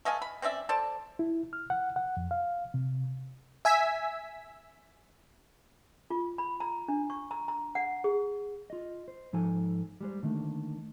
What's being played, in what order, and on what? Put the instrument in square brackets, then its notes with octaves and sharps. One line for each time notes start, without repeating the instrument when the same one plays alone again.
[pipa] A3 D#5 F5 G#5
B5
C4 C#4 D5 E5
A4 C5 D5 A5
[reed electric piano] E4
F6
F#5
F#5
F2
F5
C3
[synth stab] E5 G#5 E6 B6
[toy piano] F4
B5
A#5
D4
C#6
A#5
A#5
F#5
G#4
[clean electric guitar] F4 D#5
C5
G#2 F3 D#4 A4 G#5
G3 G#3 C5
D3 D#3 A3 A#3